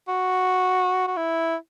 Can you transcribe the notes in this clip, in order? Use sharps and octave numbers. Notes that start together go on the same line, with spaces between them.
F#4
F#4
E4